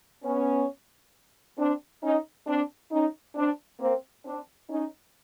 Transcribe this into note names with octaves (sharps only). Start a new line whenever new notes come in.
B3 C#4
C4 D4
C#4 D#4
C4 D4
C#4 D#4
C4 D4
A#3 C4
C4 D4
C#4 D#4